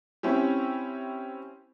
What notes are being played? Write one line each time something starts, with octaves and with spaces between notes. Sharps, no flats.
C4 C#4 E4 G4